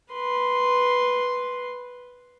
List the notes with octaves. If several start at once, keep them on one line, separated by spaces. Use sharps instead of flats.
B4 C6